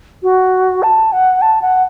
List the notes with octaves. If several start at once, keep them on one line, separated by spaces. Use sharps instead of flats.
F#4
A5
F#5
A5
F#5